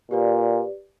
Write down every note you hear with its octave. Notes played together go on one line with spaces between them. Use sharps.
A#2 G4 B4 D5